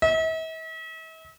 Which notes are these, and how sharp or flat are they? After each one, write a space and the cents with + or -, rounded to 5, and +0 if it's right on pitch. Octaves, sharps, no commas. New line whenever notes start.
E5 -45